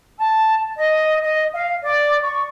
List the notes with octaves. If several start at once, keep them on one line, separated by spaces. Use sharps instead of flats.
A5
D#5
D#5
F5
D5
C#6